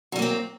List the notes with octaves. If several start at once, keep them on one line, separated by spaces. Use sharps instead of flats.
F#3 G3 A#3 C4